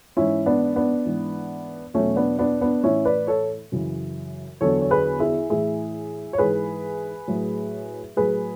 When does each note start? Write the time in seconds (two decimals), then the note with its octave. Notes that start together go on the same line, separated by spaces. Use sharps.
0.17 G#2 E3 C#4 E4
0.46 B3 D4
0.76 B3 D4
1.06 G#2 E3
1.94 E2 B2 F#3 A3 C#4
2.16 B3 D4
2.39 B3 D4
2.61 B3 D4
2.83 A2 E3 C#4 E4
3.05 B4 D5
3.27 A4 C#5
3.72 F#2 C#3 E3
4.61 E2 D3 F#3 A4 C#5
4.81 C#5
4.91 G#4 B4
5.20 E4 G#4
5.50 A2 E3 E4 G#4
6.33 C#5
6.38 G#2 E3 G#4 B4
7.28 A2 F#3
8.16 A2 F#3 G#4 B4